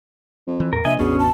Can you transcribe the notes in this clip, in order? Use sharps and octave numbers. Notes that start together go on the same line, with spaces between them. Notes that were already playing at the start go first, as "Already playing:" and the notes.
F2
E3
E2 A2 A#4
A#1 C3 D#5 E5 G#5
A1 E2 B2 C#4 D4 G#4
A5